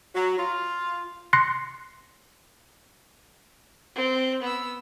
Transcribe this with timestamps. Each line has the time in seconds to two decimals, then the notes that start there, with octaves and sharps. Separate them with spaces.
0.15 F#3
0.38 F4
1.33 C6 F#6 A#6 C7 C#7
3.96 C4
4.42 B3 E6